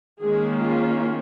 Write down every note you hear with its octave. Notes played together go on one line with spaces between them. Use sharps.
D#3 G#3 A#3 C#4 G#4
F4